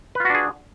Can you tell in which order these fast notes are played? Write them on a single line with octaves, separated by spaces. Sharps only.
B4 F4 F#4 D4 G#4